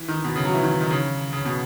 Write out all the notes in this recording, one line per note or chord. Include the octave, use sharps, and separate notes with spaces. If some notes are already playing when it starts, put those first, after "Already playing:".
Already playing: E3
D#3
B2
C#3
F#3
E3
D#3
D#3
C#3
C#3
B2